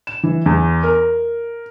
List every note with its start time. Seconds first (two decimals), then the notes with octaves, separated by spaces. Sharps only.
0.07 E7
0.23 E3
0.46 E2
0.83 A#4